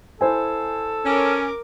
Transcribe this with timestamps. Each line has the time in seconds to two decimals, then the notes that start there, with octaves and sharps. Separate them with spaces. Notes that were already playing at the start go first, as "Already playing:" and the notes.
0.21 E4 A4 C5 G#5
1.05 C#4 A#4 D6